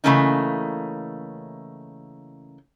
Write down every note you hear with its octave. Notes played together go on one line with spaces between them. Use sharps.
C#3 E3 A3 A#3 C#4 D#4